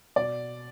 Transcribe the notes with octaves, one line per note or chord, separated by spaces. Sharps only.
B2 D5